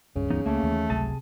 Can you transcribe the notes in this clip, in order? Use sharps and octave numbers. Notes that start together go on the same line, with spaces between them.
D#1 C#2 G2 C#3
E3 B3 D#4
C#2 A3 A#3
D#2 E3
G#1 C#2 C3 F#3 G#4 A5